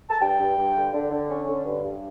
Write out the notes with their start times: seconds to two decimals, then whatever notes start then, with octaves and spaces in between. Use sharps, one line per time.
0.10 A5
0.21 G2 G5
0.39 G2
0.57 G2
0.75 D3
0.93 D3
1.11 D3
1.29 C#4
1.48 D3
1.65 G2
1.84 G2